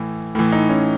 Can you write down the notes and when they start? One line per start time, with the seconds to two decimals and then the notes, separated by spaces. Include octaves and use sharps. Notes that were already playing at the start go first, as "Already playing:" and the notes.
Already playing: A2 E3
0.35 A2 E3
0.52 D#4
0.69 C#4